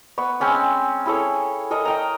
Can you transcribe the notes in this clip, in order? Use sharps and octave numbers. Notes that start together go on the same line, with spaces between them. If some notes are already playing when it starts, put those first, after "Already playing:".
B3 B5 C#6
G#3 C4 C#4 E6
E4 G#4 A4 C#5
A4 A#4 D#5
D#5 G5 A#5